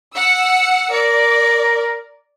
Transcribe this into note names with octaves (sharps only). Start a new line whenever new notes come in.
F#5 E6 C#7
A#4 D5